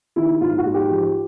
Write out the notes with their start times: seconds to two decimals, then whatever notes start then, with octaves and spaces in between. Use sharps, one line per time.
0.16 D#3 E4
0.41 G#2 F4
0.58 F#4
0.65 G#2
0.74 G4
0.91 F3